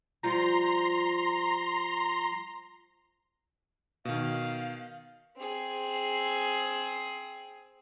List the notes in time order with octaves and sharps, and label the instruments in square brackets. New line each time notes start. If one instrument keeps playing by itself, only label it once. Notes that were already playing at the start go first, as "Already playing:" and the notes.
[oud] F3 G3 F4 [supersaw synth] A#5 C6
[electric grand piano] B2 D#3 [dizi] F5
[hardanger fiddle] C4 G#4